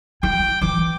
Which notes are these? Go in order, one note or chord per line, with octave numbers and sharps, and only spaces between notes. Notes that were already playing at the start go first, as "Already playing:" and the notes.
E4 G5
E3 D6